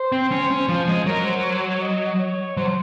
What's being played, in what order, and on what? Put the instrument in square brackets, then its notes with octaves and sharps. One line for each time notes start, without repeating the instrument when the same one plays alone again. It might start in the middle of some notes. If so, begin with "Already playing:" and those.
Already playing: [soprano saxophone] C5
[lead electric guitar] C4
C#4
C#4
F3
G#3
[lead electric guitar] F#3 [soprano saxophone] A#4
[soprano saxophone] C5
C5
C#5
D#5
D#5
C#5
[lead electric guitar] F#3 [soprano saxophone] C5